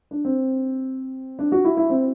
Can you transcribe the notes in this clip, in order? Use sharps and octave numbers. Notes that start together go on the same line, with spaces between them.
D4
C4
D4
F#4
E4
E4
C4